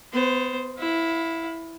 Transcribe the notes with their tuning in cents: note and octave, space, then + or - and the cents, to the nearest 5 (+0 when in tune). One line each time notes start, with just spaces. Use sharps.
B3 +30 C5 +0
E4 +0 F5 +30